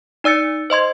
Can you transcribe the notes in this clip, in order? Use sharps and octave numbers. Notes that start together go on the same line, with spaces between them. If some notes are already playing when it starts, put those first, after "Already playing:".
D#4 D5 E6 A6 C#7
C5 D#5 C6 G#6